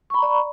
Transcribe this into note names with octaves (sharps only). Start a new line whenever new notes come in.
D5 A#5 B5 C#6